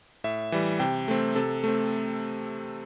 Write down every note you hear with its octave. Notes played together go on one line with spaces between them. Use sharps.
A2 E5
E3 G3
C3 G5
A3 C4
C3 A4
A3 C4